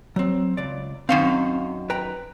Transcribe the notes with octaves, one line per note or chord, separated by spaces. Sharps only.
F#3 C4
C#2 D5
F#2 D#3 C4 F5
B4 G5 A#5